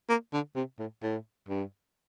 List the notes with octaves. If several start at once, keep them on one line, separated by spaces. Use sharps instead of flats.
A#3
D3
C3
A2
A2
G2